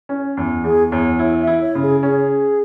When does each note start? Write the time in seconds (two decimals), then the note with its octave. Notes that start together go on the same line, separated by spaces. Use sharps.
0.09 C#4
0.37 E2
0.64 E2 G#4
0.92 E2 C#5
1.19 E4 C#5
1.40 E5
1.47 E4
1.61 C#5
1.75 C#3
1.82 G#4
2.02 C#4 G#4